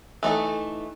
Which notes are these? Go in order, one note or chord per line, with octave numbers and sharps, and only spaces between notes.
E3 A3 D#4 A4